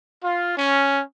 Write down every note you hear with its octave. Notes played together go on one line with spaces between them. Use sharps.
F4
C#4